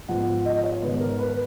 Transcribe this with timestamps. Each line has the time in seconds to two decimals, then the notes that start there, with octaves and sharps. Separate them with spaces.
0.09 G#2 F3 B3 F#5
0.45 D#5
0.64 C#5
0.82 G#2 D#3 G#3 B3 B4
1.01 A#4
1.19 B4